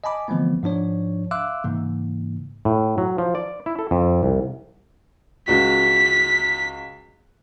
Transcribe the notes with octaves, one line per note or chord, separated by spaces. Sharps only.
D#5 G#5 A5 B5 D6
D3 E3 F3 A3 B3 C4
G#2 F3 D4 C#5
E5 F5 C6 D6 E6 F#6
G#2 C#3 E3 A#3
A2
F#3
F3
D5
E4
A4
F2
C2
C#2 F#4 B6